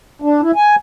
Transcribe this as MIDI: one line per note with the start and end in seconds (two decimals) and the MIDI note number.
0.22 0.41 62
0.42 0.51 64
0.56 0.76 80